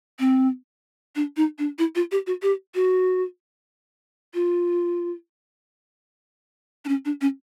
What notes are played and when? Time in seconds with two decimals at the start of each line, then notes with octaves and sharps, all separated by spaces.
0.19 C4
1.16 D4
1.37 D#4
1.58 D4
1.79 E4
1.95 F4
2.11 G4
2.27 F#4
2.42 G4
2.75 F#4
4.34 F4
6.85 D4
6.88 C#4
7.05 D4
7.21 C#4